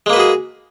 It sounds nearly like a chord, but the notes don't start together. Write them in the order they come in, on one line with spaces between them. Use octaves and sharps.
G#3 A#3 B4 F#4 G#4